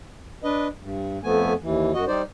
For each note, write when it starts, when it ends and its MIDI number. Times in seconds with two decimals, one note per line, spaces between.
0.44 0.68 62
0.44 0.68 71
0.44 0.68 75
0.81 1.18 43
1.24 1.53 41
1.24 1.53 53
1.24 1.53 57
1.24 1.53 59
1.24 1.53 80
1.62 1.92 39
1.62 1.92 52
1.94 2.05 42
1.94 2.05 66
1.94 2.05 75
2.07 2.22 55
2.07 2.22 63
2.07 2.22 72
2.07 2.22 74